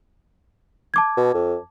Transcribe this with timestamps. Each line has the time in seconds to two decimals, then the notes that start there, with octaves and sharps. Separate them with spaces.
0.94 A5 D6 G#6
1.17 B2
1.34 F2